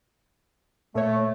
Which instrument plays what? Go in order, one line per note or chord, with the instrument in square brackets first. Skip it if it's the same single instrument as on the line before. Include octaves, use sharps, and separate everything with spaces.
[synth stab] A#2 C#5 [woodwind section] A3